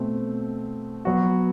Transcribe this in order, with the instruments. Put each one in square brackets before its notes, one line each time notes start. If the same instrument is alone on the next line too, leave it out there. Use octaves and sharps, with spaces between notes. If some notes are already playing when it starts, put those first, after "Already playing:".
Already playing: [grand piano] B2 A3 C4
F#3 B3 F#4